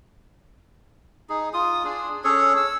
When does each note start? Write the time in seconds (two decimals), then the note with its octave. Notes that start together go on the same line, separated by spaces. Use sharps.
1.29 D#4 G#4
1.53 F4 D#6
1.84 D4 G#4
2.24 C#4 G#4 A4 C#5
2.56 E6